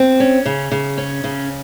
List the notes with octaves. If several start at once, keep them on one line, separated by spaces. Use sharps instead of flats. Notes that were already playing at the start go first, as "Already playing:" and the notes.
Already playing: C4
C#4
C#3
C#3
C#4
C#3